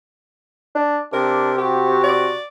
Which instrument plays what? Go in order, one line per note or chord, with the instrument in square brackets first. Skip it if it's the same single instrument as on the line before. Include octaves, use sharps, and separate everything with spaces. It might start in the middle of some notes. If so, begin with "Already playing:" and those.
[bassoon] D4
[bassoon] C3 [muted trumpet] D4 [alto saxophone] A#4
[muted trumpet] F#4 [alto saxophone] G4
[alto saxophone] D5